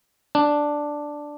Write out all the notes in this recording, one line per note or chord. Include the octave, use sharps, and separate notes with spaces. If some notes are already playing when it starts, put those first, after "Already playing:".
D4